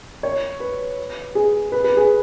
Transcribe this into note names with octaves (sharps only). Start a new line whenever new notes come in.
C#5
B4
G#4
B4
B4
G#4